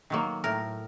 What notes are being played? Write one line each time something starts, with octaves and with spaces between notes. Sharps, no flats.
D#3 F#3 A#3
A2 A#4